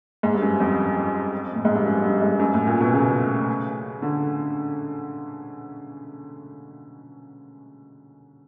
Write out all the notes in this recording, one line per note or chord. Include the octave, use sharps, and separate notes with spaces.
G#2
G2
F#2
F2
A2
G#2
G2
F#2
G2
G#2
F#2
A2
A#2
B2
C#3
D3